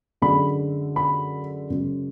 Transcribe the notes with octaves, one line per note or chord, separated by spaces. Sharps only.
F#2 D3 G#3 B5
B5
F#2 C#3 G#3